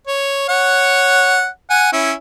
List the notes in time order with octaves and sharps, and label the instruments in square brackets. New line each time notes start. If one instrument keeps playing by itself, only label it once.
[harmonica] C#5
C#5 F#5
F#5 G#5
C#4 E4